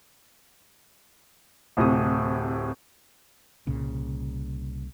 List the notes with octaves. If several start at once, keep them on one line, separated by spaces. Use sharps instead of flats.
D1 A2 C3 D#6
C2 A#2 C#3